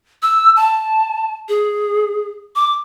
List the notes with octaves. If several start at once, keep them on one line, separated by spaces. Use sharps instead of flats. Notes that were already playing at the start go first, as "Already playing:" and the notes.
E6
A5
G#4
D6